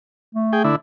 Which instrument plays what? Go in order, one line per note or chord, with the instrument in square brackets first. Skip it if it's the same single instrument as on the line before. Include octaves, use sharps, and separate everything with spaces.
[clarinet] A3
[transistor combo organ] G#4 G5
D3 E4